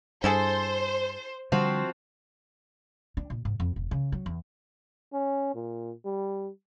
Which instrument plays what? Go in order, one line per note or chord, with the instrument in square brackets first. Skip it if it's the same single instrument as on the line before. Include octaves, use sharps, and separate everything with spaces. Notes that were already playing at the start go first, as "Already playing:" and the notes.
[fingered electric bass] G2 [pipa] E4 G#4 A4 [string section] C5
[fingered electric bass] D3 G3 [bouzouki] F3 C4 F#4
[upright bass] D4
A#2
G#2
F2
E1
C#3
F#3
E2
[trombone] C#4
A#2
G3